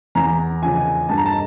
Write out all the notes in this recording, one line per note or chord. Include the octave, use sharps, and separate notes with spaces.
E2 A#5
C#3 F3 G#5
G2 A5
A#5
A5